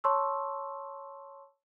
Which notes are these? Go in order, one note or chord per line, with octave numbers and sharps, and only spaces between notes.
C#5 A5 C6 C#6 E6